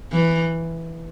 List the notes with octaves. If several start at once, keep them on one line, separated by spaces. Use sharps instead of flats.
E3